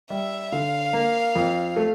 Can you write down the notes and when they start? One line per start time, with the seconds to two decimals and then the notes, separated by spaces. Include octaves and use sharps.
0.10 G3 E5
0.52 D3 F5
0.93 A#3
1.35 F2
1.76 A3